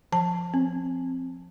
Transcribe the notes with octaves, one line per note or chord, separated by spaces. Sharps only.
F3 A5
C4